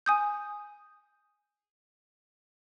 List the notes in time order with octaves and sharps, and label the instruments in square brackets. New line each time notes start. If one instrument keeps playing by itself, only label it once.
[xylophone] G#5 D#6 G6